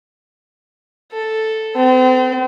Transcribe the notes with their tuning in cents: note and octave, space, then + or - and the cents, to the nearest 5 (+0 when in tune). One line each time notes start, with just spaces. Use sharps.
A4 +0
C4 -40